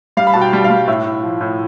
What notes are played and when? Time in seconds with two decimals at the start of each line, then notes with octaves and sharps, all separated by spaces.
0.17 G3 F5
0.27 B5
0.34 B2 A5
0.41 G5
0.53 G3
0.64 F5
0.70 G3
0.87 A2 E5
1.06 A2
1.23 F3
1.41 A2